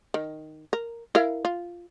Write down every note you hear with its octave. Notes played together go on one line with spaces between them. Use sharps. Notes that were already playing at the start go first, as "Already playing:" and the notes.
D#3
A#4
E4 A#4 F5
F4